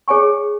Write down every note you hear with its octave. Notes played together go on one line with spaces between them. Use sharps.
G#4 C#5 G#5 C#6